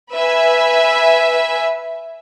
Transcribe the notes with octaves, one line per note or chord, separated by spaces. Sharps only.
B4 E5 G#5